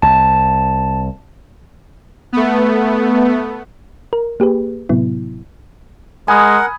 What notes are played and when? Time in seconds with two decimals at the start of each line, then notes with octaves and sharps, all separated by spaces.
0.02 C2 A5
2.33 A3 B3
4.13 A#4
4.40 A#3 G4 G#4 B4
4.89 A2 C3 F#3 B3 E4
6.28 G#3 A#4 F#5 G#5 B5 D#6